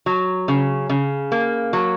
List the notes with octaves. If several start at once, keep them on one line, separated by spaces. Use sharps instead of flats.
F#3
C#3
C#3
A#3
F#3